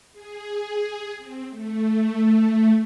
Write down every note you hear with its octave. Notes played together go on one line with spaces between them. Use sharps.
G#4
C4
A3